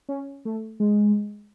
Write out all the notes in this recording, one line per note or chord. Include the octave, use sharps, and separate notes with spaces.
C#4
A3
G#3